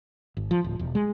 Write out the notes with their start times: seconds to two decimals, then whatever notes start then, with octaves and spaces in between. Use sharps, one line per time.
0.37 G#1
0.51 F3
0.64 D1
0.79 E1
0.95 G#3